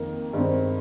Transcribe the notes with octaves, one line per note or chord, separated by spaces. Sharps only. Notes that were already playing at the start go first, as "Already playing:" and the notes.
Already playing: F2 D#3 A#3
G2 D#3 G#3 C4